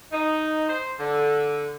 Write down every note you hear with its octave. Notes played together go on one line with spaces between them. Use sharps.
D#4
C5
D3